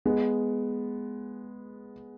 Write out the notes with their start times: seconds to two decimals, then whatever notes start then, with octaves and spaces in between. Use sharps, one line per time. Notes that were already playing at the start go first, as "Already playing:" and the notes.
0.05 G#3 B3